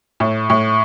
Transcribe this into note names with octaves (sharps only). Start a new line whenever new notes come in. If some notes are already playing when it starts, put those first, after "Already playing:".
A2
A2